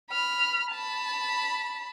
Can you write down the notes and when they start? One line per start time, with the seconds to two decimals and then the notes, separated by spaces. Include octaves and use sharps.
0.10 B5 F6
0.72 A5 B5